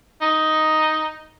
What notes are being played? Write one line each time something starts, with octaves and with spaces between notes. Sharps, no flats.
D#4